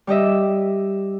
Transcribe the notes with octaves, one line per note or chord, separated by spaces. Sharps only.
G3 G4 D#5 E5